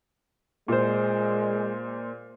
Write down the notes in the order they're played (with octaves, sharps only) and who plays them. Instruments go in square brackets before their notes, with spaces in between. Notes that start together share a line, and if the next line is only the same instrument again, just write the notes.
[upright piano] A#2 C5 [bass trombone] G#3